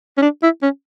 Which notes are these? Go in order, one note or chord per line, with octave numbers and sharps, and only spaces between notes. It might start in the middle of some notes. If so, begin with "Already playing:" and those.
C#4
D4
E4
C#4